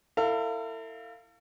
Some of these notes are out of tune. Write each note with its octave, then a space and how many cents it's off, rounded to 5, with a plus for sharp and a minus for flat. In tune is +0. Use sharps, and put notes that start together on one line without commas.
E4 +0 A4 +45 F5 +0